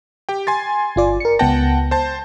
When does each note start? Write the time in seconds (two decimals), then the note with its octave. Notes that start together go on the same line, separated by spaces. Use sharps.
0.29 G4 G5
0.47 G#5 C6 A6
0.96 G1 F4 D5
1.20 A#4 C#7
1.39 C#2 B3 F#5 G5 A5 A#6
1.91 C5 A5